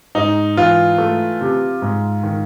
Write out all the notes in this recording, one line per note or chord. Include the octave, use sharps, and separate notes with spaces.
G#2 D#4
E3 F4
A3
C3
G#2
D#3